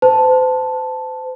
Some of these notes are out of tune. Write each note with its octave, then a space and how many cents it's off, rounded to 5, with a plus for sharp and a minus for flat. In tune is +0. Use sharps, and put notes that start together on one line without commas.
C5 -40 A5 +0